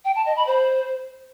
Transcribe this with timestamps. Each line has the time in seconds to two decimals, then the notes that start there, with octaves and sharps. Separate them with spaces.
0.05 G5
0.15 A5
0.26 D#5
0.36 B5
0.47 C5